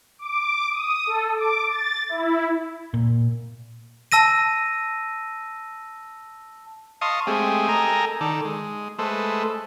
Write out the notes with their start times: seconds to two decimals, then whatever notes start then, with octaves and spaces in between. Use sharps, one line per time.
0.19 D6
0.70 D#6
1.07 A4
1.36 D6
1.68 A6
2.09 E4
2.94 A#2
4.12 A5 E6 A#6 D#7
7.01 D#5 F5 A5 C6 C#6 D#6
7.27 G#3 A3 C4 G4 G#4
7.69 A4 A#4 D#5 G5 G#5 A#5
8.21 D#3 A4 D5
8.45 G#3
8.99 G#3 A3 A4 B4 C5